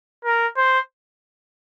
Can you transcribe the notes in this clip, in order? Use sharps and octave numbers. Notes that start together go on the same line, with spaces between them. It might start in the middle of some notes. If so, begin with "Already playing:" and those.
A#4
C5